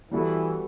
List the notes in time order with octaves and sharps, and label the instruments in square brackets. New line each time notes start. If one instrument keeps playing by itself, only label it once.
[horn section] E3 [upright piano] G3 B3 F#4 A4